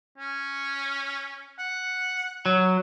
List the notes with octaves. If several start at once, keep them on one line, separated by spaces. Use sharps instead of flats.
C#4
F#5
F#3